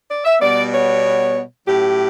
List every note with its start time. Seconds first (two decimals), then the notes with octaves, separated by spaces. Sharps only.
0.09 D5
0.25 E5
0.40 B2 G3 B3 D5
0.72 C#5
1.67 A2 F#3 C#4 G4